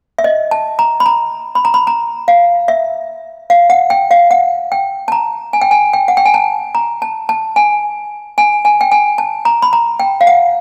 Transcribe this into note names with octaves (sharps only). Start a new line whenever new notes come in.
E5
D#5
A5
A#5
B5
A#5
B5
A#5
B5
A#5
F5
E5
F5
F#5
G5
F5
F#5
G5
A5
A#5
G#5
G5
G#5
G5
F#5
G5
G#5
A5
A#5
A5
A5
G#5
G#5
G#5
G5
G#5
A5
A#5
B5
A#5
G5
F5
F#5